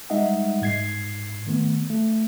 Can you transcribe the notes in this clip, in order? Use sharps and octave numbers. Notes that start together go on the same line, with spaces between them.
G3 G#3 D#4 D#5 E5 F#5
G#2 G#6 C7
D#3 A3 B3
A3